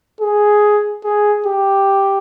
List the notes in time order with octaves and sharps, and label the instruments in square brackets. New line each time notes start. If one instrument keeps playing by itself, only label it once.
[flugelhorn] G#4
G#4
G4